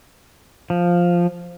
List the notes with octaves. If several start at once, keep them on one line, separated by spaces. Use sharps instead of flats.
F3